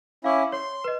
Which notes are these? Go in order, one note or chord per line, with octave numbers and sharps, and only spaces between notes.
C#4 E4 F5 D6
C#5 C6
B4 D#5